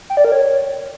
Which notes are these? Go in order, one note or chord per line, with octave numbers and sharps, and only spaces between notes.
G5
D5
A#4
C#5